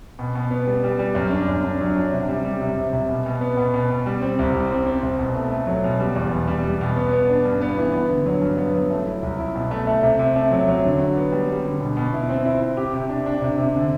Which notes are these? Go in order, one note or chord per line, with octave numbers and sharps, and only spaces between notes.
B2
B2
B3
G3
G3
G3
F#2
D4
F#2
D4
F#3
D4
C3
G3
G3
C3
C3
C3
B2
B2
B3
B2
B2
B2
G3
C4
C2
G3
C4
C4
C2
B2
A3
A3
F#3
B2
G3
E2
B2
G3
G3
B2
B3
B3
D4
G2
B3
E3
B3
D3
F#3
G2
B3
F#3
A3
E4
C2
E4
B2
A3
A3
C3
C3
A3
F#3
F#3
D3
F#4
B3
G3
G3
D3
B2
B2
E4
C4
E4
E4
G4
C3
D4
D4
C3
C3
D3